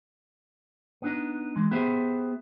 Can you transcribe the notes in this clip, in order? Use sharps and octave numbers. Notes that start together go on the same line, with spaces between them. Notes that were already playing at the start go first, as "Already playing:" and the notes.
B3 D4 D#4
E3 G#3
B3 G4 G#4 C5 E5